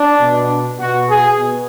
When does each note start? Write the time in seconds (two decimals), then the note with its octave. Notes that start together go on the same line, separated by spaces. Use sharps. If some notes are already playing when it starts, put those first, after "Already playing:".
Already playing: D4
0.20 B2
0.79 B2 F#4
1.09 G#4
1.39 B2